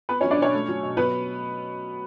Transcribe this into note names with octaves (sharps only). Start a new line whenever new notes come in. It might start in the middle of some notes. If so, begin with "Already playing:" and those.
B3 B4
F#3 C#4 C#5
D4 D5
B2 C#4 C#5
A3
F#3
B2
F#3 B3 B4